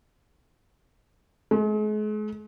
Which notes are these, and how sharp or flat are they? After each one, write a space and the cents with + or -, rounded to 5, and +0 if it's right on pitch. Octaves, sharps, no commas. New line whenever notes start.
G#3 +40